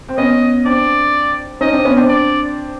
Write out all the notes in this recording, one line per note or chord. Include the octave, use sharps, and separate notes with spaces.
C4
B3 C#4 D#5
C4 D4 D5
C#4 D#4 D#5
C4 D4
B3 C#4
C4 D4
D5